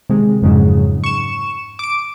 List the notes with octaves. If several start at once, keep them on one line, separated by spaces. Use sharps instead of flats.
C3 D#3 G#3
F2 G#2 C#3 F#3
C#6 E7
D6 D7